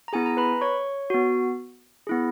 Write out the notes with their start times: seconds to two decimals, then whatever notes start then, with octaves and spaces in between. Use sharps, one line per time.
0.08 A#5
0.13 B3 E4 G#4 G#5
0.26 A#5
0.37 B4 B5
0.61 C#5 C#6
1.10 B3 F#4
2.07 B3 E4 G#4